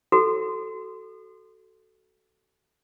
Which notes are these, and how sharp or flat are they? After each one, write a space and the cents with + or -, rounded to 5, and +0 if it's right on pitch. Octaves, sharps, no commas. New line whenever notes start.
F#4 +25 A4 +0